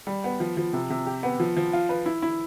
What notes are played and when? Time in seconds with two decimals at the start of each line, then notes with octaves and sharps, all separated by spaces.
0.07 G3
0.24 B3
0.40 F3
0.57 F3
0.73 C3
0.90 C3
1.06 G4
1.23 B3
1.40 F3
1.57 F3
1.73 F4
1.89 B4
2.06 E4
2.22 E4